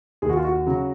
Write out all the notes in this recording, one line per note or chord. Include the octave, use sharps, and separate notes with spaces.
D#2 G#4
F#4
F4
F#4
C#3 F#3